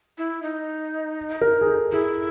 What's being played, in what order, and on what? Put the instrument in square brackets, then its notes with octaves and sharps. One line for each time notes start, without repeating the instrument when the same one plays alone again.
[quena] E4
D#4
[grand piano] A#4
G#4
A4
[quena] E4 [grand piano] G#4